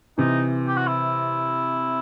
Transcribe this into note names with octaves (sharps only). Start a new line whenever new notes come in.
C3 E3 D#4
G4
F#4
E4